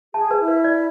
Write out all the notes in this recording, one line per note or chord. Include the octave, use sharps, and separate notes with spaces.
G#4 A5
B4
E4
B4
D5